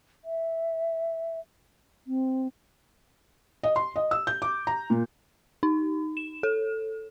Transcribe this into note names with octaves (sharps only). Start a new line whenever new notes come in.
E5
C4
D#5
C6
D#5
E6
G6
D6
A#5
A#2
D#4
E7
A4